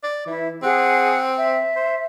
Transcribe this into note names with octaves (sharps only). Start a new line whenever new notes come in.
D5
E3 E4
C4 G#4 F#5 F#6
E5
C5